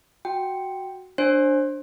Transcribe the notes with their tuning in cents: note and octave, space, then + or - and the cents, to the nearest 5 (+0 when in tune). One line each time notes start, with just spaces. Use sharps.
F#4 +0 G5 +0
D4 +0 C5 +25